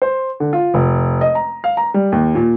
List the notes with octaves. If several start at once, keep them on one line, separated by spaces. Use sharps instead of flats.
C5
D3
F4
F1
D#5
A#5
F5
A#5
G3
D#2
A#2